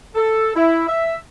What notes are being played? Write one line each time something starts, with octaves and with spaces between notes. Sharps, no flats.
A4
E4
E5